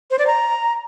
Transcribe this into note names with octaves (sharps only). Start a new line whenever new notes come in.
C5
D5
A#5